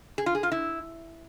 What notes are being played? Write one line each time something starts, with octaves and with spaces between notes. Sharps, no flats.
G#4
F4
G#4
F4
E4